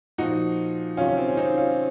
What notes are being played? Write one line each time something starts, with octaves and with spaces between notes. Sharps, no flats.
A#2 F3 D#4 F#4
C3 D#3 F#3 C#4 F4
C#4
C4
C#4
C4 D#4
C#4 F4